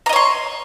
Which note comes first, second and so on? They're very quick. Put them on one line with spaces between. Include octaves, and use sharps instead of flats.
A#5 D#5 C#5 C6